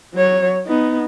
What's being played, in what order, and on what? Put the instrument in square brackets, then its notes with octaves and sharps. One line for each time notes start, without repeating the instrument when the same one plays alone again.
[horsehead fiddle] F#3 C#5
B3 D#4